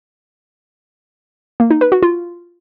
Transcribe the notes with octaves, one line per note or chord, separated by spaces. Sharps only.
A#3
D#4
B4
F#4
F4